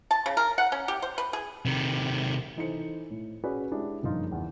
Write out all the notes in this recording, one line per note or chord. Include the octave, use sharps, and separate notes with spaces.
A5
C#3
A#4
F#5
C#4
G4
C5
B4
G#4
C3 D#3
E3 D#4 A4 C5 C#7
A2
C#4 F#4 G#4 B4 D5
G#3 D4 E4 G4 G#4
F#1 G2 F3 D#4 F4
E2